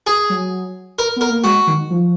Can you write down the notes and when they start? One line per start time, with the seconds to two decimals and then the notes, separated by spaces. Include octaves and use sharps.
0.07 G#4
0.30 F#3
0.99 A#4
1.16 B3 A#4
1.30 A#3
1.44 G#3 F#4
1.67 D#3
1.90 F3